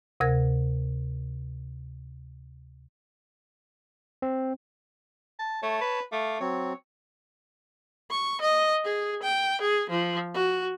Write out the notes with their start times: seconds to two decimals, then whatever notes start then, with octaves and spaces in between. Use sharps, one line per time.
0.20 D2 C3 A#4 G#6
4.22 C4
5.39 A5
5.62 A3 C#5 A5
5.81 B4
6.12 A3 F5 D6
6.40 F#3 C4 C#5
8.10 C#6
8.41 D#5
8.84 G#4
9.23 G5
9.60 G#4
9.90 F3
10.34 F#4